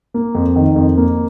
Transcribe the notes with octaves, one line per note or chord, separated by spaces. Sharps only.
A#3
F2
D#3
F2
A#3